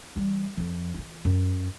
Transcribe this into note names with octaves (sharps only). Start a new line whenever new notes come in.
E3 G3
F2 F3
E3 F4
F#2